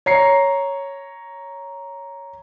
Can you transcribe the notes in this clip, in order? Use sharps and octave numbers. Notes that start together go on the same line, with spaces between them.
C#5 A#5 C7 C#7